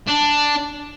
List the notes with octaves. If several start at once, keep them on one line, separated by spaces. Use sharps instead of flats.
D4